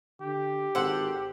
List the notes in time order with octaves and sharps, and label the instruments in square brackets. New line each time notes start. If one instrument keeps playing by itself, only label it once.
[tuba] D3 [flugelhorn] G4
[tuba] G#1 [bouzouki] A4 C5 F#5